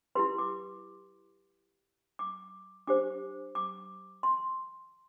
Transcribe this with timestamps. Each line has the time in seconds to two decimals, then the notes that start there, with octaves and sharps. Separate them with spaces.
0.15 E4 G4 B4 C6
0.38 D6
2.19 D6
2.87 D4 G4 C5 D6
3.55 D6
4.23 C6